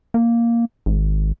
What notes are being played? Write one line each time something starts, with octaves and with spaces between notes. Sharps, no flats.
A#3
G#1